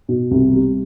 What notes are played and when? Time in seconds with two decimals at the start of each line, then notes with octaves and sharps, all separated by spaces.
0.09 B2
0.31 C2
0.53 G3